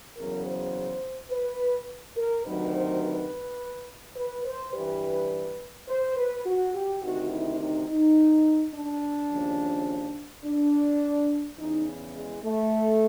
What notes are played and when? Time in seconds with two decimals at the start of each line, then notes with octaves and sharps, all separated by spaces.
0.17 E2 C#3 F#3 A#4
0.45 C5
1.31 B4
2.17 A#4
2.45 D2 C3 D#3 F#3 B4
2.74 C5
3.02 B4
4.16 B4
4.45 C5
4.73 G2 E3 G3 B4
5.88 C5
6.16 B4
6.45 F#4
6.74 G4
7.02 D2 C3 D#3 F#4
7.31 E4
7.59 D#4
7.88 D#4
8.73 D4
9.30 D#2 C#3 F3
10.45 D4
11.59 E2 C#3 E3 D#4
12.16 G#3
12.44 A3